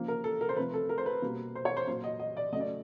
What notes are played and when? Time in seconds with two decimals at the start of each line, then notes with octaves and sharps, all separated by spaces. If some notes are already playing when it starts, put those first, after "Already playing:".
Already playing: C#3 F3 A#3
0.08 A#4
0.24 A4
0.41 A#4
0.49 C5
0.57 C3 F3 A3 B4
0.74 A4
0.89 A#4
0.98 C5
1.06 B4
1.22 B2 G3 A#3
1.55 C5
1.65 C#5
1.77 C5
1.87 A#2 F#3 A#3 C5
2.04 D#5
2.19 D#5
2.37 D5
2.52 C#3 F#3 A3 D#5
2.60 D5